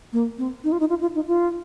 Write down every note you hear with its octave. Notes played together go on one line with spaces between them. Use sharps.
A#3
C4
D#4
F4
D#4
F4
F4
D#4
F4